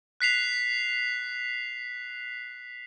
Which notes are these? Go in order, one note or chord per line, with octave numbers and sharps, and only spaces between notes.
F#6 B6 C7 F7